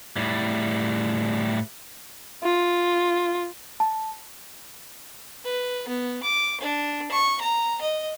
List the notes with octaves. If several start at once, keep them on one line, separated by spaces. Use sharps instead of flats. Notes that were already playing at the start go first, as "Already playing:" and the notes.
A2 G3
F4
A5
B4
B3
D6
D4
C#6
A#5
D#5